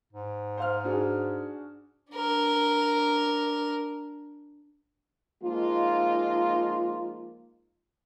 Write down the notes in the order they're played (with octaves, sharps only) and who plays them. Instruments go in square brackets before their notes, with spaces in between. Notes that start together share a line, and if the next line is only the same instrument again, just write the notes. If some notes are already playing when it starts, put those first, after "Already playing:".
[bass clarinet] G#2
[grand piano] C5 F5 F6
D4 F#4 G#4
[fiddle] D4 A#4
[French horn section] F3 G#3 A#3 D#4 F4